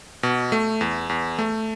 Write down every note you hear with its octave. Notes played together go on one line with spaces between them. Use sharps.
B2
A3
E2
E2
A3